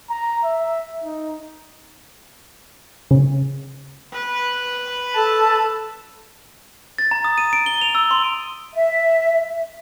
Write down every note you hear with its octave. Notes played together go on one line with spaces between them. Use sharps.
A#5
E5
D#4
C#3
B4
A4 A5
A6
A#5
D#6
D#7
D7
G7
F7
E6
C6
E5